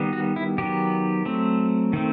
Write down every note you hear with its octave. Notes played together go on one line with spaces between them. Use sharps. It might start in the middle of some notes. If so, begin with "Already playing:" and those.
Already playing: D#3 G3 B3
F#4
E4
D#3 F#3 B3 G4
F#3 A3 C4
D#3 A3 C4